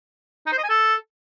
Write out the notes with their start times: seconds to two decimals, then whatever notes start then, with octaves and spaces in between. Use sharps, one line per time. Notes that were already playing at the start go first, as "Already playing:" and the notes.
0.46 D#4
0.52 C5
0.58 D#5
0.63 G#5
0.69 A4